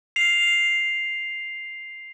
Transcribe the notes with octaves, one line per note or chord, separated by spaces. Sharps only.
C7 F7